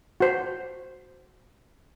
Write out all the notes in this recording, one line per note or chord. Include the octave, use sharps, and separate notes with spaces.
F#4 C5